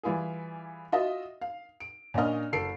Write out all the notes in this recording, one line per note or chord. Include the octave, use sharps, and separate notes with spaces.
E3 G3 E4 F4 G#4
F4 F#4 D#5 E5
F5
D7
A#2 C#4 D4 A#4 D#5 F6
F#1 A4 C7 D7